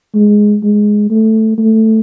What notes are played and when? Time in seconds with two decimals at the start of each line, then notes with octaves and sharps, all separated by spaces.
0.15 G#3
0.63 G#3
1.10 A3
1.58 A3